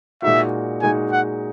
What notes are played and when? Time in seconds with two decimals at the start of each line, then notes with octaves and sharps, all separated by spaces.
0.22 A#2 G#3 D#4 F#4 E5
0.82 A#2 G#3 D#4 F#4 G#5
1.12 F#5